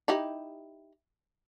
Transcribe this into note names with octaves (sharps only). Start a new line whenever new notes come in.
D#4 E4 G4